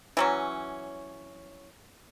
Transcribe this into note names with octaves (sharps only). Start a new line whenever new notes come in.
E3 F#3 C#4